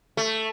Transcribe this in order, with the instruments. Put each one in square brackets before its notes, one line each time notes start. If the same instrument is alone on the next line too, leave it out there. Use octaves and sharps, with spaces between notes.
[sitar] A3